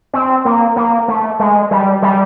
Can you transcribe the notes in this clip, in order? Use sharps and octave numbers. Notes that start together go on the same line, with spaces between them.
C4
A#3
A#3
A3
G#3
G3
G3